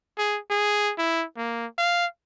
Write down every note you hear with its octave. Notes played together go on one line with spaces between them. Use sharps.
G#4
G#4
E4
A#3
F5